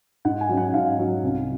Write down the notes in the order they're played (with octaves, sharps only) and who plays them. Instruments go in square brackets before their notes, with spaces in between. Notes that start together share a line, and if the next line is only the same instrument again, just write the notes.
[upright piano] G#2 F#5
G#5
F#3 C#4
F#5
G#2 F5
F#3 C#4
C2